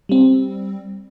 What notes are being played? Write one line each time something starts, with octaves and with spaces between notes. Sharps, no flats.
G3 C4